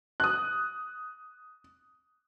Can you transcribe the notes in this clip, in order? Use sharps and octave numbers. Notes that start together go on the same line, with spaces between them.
D#6 F#6